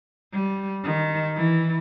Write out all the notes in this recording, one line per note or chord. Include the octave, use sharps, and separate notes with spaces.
G3
D#3
E3